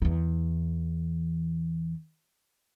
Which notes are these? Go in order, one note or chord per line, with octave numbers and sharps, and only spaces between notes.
E2 E3